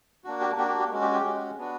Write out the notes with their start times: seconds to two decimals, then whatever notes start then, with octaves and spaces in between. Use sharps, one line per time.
0.24 A#3 D4 F#4
0.41 G4
0.57 A#3 D4 F#4 G4
0.68 G4
0.79 G4
0.92 G#3 C#4 F#4
1.02 G4
1.13 G4
1.24 G#3 C#4 F#4
1.58 B3 D4 F#4